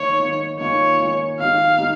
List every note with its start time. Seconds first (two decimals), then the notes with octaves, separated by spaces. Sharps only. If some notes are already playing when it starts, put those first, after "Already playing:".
Already playing: D#3 A#3 D#4 C#5
0.20 D#3 A#3 D#4
0.59 D#3 A#3 C#4 F4 C#5
0.99 D#3 A#3 C#4 F4
1.39 D#3 A#3 D#4 G4 F5
1.78 D#3 A#3 D#4 G4